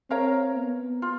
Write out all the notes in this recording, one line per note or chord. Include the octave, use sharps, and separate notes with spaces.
C4 A#4 C#5 F5 A#5
B3
F4